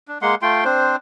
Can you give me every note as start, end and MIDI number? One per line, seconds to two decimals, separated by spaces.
0.08 0.18 62
0.22 0.35 56
0.22 0.35 58
0.22 0.35 78
0.22 0.35 84
0.42 0.64 57
0.42 0.64 65
0.42 0.64 79
0.42 0.64 84
0.65 0.96 60
0.65 0.96 62
0.65 0.96 72